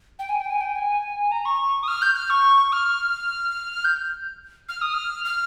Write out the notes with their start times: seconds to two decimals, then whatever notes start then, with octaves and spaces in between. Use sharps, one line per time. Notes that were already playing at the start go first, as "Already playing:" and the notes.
0.19 G5
0.29 G#5
0.40 G5
0.50 G#5
0.61 G5
0.75 G#5
1.31 A#5
1.45 C#6
1.83 D#6
1.88 F6
2.02 G6
2.16 F6
2.30 C#6
2.72 F6
3.84 G6
4.69 F6
4.81 D#6
4.94 F6
5.25 F6